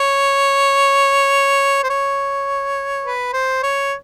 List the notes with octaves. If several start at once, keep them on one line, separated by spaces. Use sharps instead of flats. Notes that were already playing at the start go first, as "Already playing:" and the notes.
Already playing: C#5
C5
C#5
B4
C5
C#5